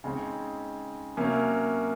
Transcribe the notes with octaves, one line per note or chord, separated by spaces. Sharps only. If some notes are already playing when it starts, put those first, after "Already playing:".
C#3 G#3 C4 D#4
C3 F#3 A#3 C#4